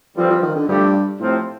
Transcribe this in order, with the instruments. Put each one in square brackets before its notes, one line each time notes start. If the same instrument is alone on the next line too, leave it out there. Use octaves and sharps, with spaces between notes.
[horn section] G2 D3 G3 C4 [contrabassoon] F3
[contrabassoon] F3
D#3
D3
[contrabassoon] G2 [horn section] F3 A3 C4 G4
[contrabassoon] A2 [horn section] C3 F3 C4